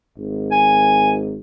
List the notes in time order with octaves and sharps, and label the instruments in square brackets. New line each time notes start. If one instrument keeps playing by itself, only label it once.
[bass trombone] G#1
[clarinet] G#5